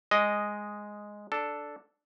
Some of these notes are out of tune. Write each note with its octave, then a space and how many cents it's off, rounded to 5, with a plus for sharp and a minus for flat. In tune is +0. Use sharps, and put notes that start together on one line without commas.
G#3 +0 D#5 +0
D4 +0 A4 +0